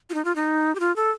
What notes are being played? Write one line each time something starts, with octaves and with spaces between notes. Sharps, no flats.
F4
D#4
F4
D#4
G4
F4
A4